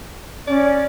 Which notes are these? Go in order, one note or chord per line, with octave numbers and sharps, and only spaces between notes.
C#4 D5